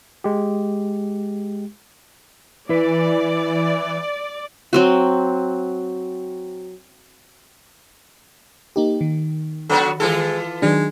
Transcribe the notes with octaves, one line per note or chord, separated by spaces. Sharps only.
G#3 G4
E3 E4 B4 D5
F#3 C4 F#4
A#3 D#4 G4
D#3
D3 F#3 B3 F#4
E3 G#3 F4 A4
D#3 F#3 G#3 D4